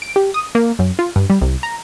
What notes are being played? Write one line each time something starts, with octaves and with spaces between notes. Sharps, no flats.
D7
G4
D#6
A#3
F#2
F4
G2
G3
C2
A#5